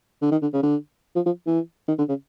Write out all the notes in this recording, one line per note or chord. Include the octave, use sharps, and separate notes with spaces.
D3
D#3
D3
C#3
D3
F3
F3
E3
D#3
D3
C#3